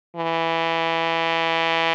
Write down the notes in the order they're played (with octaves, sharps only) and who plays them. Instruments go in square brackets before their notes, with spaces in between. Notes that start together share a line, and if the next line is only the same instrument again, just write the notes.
[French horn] E3